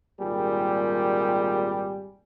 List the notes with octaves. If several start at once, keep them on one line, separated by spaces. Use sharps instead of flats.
G#1 A#2 G3 G4 G#4